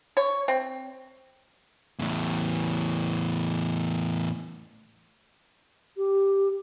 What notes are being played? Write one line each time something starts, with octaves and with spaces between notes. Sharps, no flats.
C#5
C4
E2 A2
G4